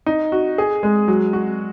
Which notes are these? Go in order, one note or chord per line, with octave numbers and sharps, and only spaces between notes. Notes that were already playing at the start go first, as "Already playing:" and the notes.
D#4
F#4
G#4
G#3
F#3
F#4